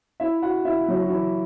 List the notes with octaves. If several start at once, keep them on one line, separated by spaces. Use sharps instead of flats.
E4 E5
F#4 F#5
E4 E5
F#3 F#4
F#4
E3 E4